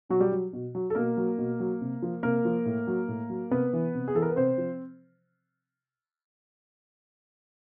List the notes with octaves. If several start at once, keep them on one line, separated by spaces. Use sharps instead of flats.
B2 F#3 F#4
G3 G4
F#3
B2
F#3
A4
B2 A#3 A#4
F#3
B2
F#3
C3
F3
C3 A#3 A#4
F3
A2
F#3
A2
F#3
C3 B3 B4
E3
C3
G#4
E3 A4
A#4
B4
C3 C4 C5
F3